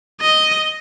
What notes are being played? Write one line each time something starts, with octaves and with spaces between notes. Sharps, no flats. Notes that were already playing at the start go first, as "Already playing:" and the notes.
D#5